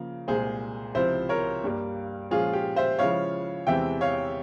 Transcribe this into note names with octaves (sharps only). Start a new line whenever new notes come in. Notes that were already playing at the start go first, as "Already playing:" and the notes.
Already playing: C#3 F3 A#3
C2 A#2 G#3 G#4 C5
C#2 C3 F3 C4 E4 C5 E5
A#4 C#5
G2 G3 A#3
A#2 F3 G#3 C#4 F4 G#4
G4
C5 E5
C#3 F3 G#3 C#4 E4 C#5 F5
E2 C3 E3 G#3 C4 E5 G5
C#5 F5